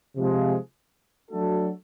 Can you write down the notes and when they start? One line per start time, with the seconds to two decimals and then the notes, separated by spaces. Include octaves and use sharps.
0.16 C3 F3 G#3
1.30 F#3 A3 D4 F#4 A4